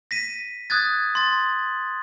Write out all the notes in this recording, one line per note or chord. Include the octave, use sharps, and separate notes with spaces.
A#6 B6 D#7
D#6 F#6 G#6 A6
C6 A6